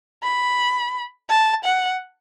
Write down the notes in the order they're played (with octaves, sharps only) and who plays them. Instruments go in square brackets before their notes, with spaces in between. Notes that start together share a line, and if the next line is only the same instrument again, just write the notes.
[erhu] B5
A5
F#5